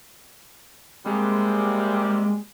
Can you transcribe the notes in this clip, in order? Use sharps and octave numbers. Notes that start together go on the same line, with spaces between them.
C3 G3 G#3 A#3